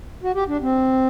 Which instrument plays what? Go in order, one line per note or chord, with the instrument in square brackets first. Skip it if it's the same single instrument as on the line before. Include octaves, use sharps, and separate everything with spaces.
[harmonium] F#4
G4
D4
C4